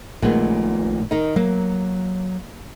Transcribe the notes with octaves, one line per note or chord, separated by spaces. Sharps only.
A#1 A#2 D#3 G#3 A3 B3
D#3 D#4
F#3 A#3